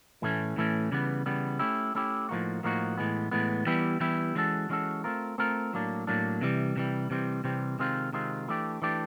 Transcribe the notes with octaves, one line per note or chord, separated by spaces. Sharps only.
A2 E3 A3 C#4
A2 E3 A3 C#4
C#3 E3 G3 B3
C#3 E3 G3 B3
A3 C#4 E4 G4
A3 C#4 E4 G4
A2 F3 A#3 D#4 F#4
A2 F3 A#3 D#4 F#4
A2 E3 G#3 B3
A2 E3 G#3 B3
E3 G3 B3 E4 G4
E3 G3 B3 E4 G4
E3 G#3 C#4 F#4 A4
E3 G#3 C#4 F#4 A4
A3 C4 F4 A#4
A3 C4 F4 A#4
A2 F#3 A#3 D4
A2 F#3 A#3 D4
C3 E3 G3
C3 E3 G3
C3 E3 G3 C4
C3 E3 G3 C4
C3 D#3 G#3 C4 F4
C3 D#3 G#3 C4 F4
E3 A3 D4 G4
E3 A3 D4 G4